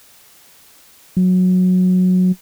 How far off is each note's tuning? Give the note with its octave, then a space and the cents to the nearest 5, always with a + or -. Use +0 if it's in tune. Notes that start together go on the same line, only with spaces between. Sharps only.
F#3 -15